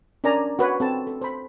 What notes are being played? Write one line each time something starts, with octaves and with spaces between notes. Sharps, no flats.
C#4 D4 A#4 D5 G#5 A#5
F#4 B4 C#5
C4 A4 A5
A4
C5 B5